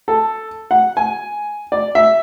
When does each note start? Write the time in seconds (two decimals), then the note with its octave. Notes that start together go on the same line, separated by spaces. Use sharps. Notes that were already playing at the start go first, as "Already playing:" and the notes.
0.08 A4
0.71 F#5
0.97 G#5
1.72 D5
1.95 E5